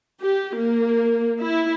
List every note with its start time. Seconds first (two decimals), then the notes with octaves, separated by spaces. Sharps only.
0.22 G4
0.55 A#3
1.40 E4